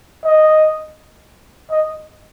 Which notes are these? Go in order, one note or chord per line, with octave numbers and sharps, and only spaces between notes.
D#5
D#5